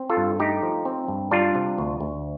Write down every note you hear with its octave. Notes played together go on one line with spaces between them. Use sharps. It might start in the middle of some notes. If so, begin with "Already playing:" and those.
Already playing: C4
F4 A4
G2
A3 D#4 G4
F3
C4
G2
G3 D4 F4
C3
D2
D2